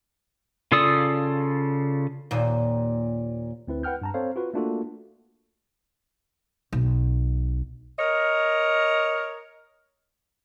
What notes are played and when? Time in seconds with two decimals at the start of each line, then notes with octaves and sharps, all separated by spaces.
0.72 C#3 F4 A4 D5 D#6
2.31 D#2 A#2
3.67 D2 C4 E4 B4
3.83 B4 F#5 G5 F6 G6
4.02 G2 A5 A#5
4.14 C4 A4 C5 C#5 F5
4.36 F4 F#4 B4
4.54 A3 A#3 D4 F4 F#4 A4
6.73 B1
7.99 A#4 C#5 D#5